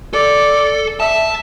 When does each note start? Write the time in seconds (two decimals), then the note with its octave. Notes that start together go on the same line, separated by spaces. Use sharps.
0.13 A4 D5
1.00 E5 A5